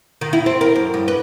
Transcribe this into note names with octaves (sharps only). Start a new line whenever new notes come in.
D#3
E4
C4
A#4
F#2
G2
B4